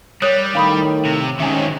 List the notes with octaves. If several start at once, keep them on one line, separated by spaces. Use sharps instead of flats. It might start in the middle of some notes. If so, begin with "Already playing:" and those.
G3 A#4 C#5 D#6 F#6 G6
A2 D#3 C#4 F5 B5 D#6
C3
G#2 D#3 F#3 C#4 E5 G#5 D6